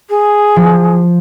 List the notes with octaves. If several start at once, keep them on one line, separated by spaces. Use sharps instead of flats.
G#4
F3